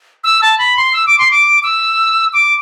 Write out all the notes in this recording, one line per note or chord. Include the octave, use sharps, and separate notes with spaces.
E6
A5
B5
C6
E6
D6
C6
D6
E6
D6